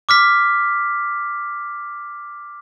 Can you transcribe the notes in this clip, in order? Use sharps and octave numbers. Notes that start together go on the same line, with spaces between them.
D6 F6 B6